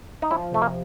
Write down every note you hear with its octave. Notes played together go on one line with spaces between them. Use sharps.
D#4
F3 E4
C3 A3
A#3